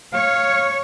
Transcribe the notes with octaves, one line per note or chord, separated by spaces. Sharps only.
C#5 F5